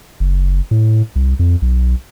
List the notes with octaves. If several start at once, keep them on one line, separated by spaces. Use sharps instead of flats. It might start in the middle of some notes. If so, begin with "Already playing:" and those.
F#1
A2
C2
F2
B1